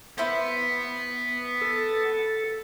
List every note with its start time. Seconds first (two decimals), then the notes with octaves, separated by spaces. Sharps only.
0.18 B3 E4 C5
1.61 A4